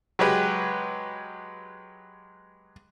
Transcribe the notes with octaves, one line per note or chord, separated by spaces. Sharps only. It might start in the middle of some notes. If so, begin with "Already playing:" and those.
F#3 G#3 G4 B4